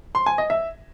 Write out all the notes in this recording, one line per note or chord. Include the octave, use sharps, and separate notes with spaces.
C6
G#5
D#5
E5